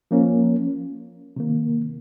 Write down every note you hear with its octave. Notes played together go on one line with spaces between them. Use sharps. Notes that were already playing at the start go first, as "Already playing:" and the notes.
F3 A#3 C#4
C3 D#3 A#3